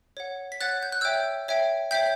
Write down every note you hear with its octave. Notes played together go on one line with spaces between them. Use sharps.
C#5 F#5
B6
C#5 F#5 F#6 A6
G6
F#6
C#5 E5 G5 E6 G6
C#5 E5 G5
C#5 E5 G5 G6 B6